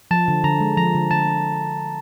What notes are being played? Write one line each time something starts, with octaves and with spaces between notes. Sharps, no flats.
F3 A5
D3
D3 A#5
G#3
F3 A#5
D3
D3 A5